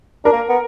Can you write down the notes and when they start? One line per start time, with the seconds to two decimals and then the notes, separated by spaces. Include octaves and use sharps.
0.25 D4 A#4
0.33 A#3
0.49 B3